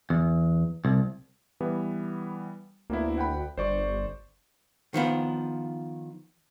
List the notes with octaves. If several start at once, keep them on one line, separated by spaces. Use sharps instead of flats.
E2
C2
E3 G3 B3
D2 A#3 B3 E4
F#5 G5 B5
G1 C5 D5 C#6
D#3 F3 B3